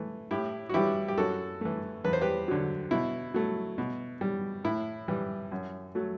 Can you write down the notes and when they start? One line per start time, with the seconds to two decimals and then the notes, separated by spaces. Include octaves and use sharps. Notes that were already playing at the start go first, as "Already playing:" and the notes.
Already playing: E3 A3
0.31 A2 E4 G4
0.69 F#4
0.74 E3 G3 E4 G4
1.08 G4
1.18 F#2 F#4 A4
1.61 E3 A3
2.04 E2 B4
2.13 C5
2.21 G4 B4
2.48 D3 F#3
2.91 B2 E4
3.34 F#3 A3
3.78 B2
4.21 G3
4.64 A2 E4
5.08 E3 G3
5.52 F#2
5.95 F#3 A3